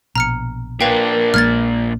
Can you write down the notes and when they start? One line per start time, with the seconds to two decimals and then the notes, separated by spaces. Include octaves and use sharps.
0.16 A#1 B2 A#5 F6 C#7
0.81 A#2 D4 A#4 B4 F5 G5
1.34 A#1 G#3 A#3 F6 G#6 A6